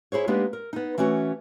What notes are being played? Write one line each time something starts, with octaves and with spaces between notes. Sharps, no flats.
E4 G#4 C5 C#5
G#3 A#3 B3 D4 D#4 G4
A#4
B3 D#4
E3 A3 C#4 F#4